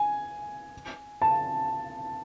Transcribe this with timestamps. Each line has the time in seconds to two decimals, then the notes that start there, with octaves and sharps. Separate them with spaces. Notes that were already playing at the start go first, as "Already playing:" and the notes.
Already playing: G#5
1.22 A5